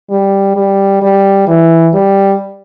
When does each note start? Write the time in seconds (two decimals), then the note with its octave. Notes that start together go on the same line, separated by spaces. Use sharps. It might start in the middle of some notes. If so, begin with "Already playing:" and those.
0.10 G3
0.56 G3
1.02 G3
1.47 E3
1.94 G3